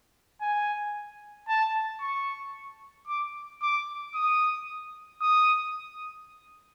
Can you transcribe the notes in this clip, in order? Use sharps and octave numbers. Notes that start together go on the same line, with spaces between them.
G#5
A5
C#6
D6
D6
D#6
D#6